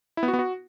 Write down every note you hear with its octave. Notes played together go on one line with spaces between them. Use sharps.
E4
B3
F#4
B3
F#4